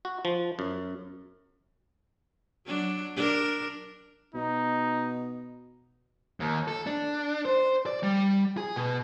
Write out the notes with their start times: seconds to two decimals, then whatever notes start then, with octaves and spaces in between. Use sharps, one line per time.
0.05 F#4
0.25 F3
0.59 F#2
2.66 F#3 D4
3.16 D4 A#4
4.35 B2 D#4
6.40 D#2
6.68 A4
6.87 D4
7.45 C5
7.87 D5
8.03 G3
8.57 G#4
8.76 B2